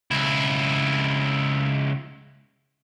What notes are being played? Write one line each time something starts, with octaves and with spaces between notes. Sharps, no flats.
C#2 E4